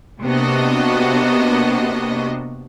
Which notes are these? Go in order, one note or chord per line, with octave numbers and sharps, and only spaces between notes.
C3 A#3 B3 D4 F#4 D#5